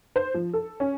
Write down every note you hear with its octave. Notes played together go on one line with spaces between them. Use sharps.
C5
F3
A4
C#4